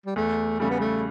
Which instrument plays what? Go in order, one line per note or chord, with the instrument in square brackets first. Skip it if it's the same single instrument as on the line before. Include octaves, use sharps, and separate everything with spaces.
[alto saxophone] G3
[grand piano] E2 [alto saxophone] A3
[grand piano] C#3 G3 [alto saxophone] A3
[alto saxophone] B3
A3